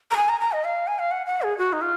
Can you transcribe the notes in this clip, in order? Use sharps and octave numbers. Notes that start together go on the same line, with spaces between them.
A#5
G#5
A#5
A#5
D#5
F5
G#5
F5
F#5
F#5
G#4
F#4
D#4
F4